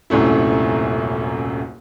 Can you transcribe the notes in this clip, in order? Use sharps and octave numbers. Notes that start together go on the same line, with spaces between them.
D#1 C2 F#2 A3 E4